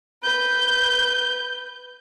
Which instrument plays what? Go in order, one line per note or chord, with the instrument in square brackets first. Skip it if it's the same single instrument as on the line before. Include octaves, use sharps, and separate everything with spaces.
[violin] B4 G6